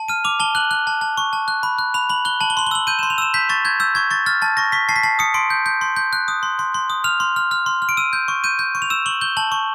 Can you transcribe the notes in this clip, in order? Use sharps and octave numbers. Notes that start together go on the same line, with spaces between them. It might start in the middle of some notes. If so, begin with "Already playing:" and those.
Already playing: A5
F6 D#7
D6 F7
A5 G7
F#6 F#7
F#6
A5
A5
C#6
A5
F#6
B5
F#6
B5 F7
B5 F#7
F#6 G7
A5 F#7
G7
C6 F#7
G7
E6 F#7
G6 D#7
E7
C6
F7
E6 E7
G6 B6
C#6 A6
G6 G#6
E6 G6
C#6 G#6
C#6 A6
F6 A6
A5 A6
C#6 A#6
C#6 B6
A5 C7
B6
A5 C7
D#6 C#7
C6 D7
G6
G6
C6
G6
F#6
D#6
C6
C6
C6
D#6
F6 F7
C6
F6
F6
C6
F6
D7
E6 D#7
G6
C#6
G6 D#7
G6
C#6
F7
E6 E7
C#6 F#7
G6 G7
A5 F#7
C#6